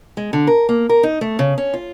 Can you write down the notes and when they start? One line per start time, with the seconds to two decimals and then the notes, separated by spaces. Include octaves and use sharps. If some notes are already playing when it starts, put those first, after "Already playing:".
0.17 G#3
0.33 D3
0.47 A#4
0.69 A#3
0.89 A#4
1.03 D#4
1.21 A3
1.39 C#3
1.58 C#4
1.74 F4